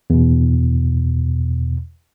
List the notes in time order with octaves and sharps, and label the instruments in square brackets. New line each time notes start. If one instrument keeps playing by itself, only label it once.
[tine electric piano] E2 B2